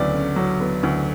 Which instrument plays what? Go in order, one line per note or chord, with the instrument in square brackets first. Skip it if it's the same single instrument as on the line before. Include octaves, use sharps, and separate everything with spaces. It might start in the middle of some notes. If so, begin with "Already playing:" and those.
Already playing: [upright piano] D2 C#3 F#3 B3 D5
C#3
F#3
B3
D2